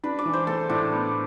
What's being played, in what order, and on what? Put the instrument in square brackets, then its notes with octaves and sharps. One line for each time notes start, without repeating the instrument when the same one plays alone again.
[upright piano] D4 [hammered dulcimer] B4
[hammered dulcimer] D5
[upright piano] E3
[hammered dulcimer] C5
[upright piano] A3 [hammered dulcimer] A4
[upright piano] A2 [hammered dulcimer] D4
[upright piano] B3